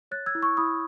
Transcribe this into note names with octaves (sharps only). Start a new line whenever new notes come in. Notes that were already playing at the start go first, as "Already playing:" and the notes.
C#5 F#6 A6
E6 G#6
E4
C#6 E6
E4 B5 D#6